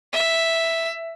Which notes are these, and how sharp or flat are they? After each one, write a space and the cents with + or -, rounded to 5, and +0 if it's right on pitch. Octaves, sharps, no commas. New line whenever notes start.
E5 +0